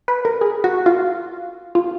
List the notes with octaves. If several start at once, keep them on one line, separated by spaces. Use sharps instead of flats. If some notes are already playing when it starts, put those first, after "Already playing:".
B4
A#4
G#4
F#4
F4
F4